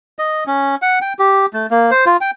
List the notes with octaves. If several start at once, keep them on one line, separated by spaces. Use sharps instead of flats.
D#5
C#4
F#5
G5
G4
A3
A#3
C5
F4
G5